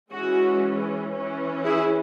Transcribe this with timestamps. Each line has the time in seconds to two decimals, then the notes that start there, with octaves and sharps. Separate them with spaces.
0.11 E3 G#3 C#4 F#4
1.13 E3 C#4
1.64 E4 G#4